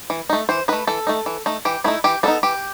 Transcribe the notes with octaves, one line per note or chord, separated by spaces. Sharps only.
E3
A3 D#4
E3 C5
A3 D#4 B4
E3 A4
A3 D#4
E3
A3 D#4
E3 G4
A3 D#4 E4
E3 G4
G3 B3 D#4 A4
E3 G4